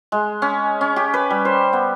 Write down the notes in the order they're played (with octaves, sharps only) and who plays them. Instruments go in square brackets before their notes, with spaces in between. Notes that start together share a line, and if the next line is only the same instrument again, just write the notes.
[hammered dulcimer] G#3
C#4
C#4
G4
B4
G3
C5
B3